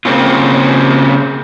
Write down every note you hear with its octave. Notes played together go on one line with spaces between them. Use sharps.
C#3 A#3 C4 C#4 F4